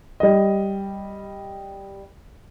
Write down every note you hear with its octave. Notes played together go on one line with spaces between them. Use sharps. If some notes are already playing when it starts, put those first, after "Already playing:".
G3 D#5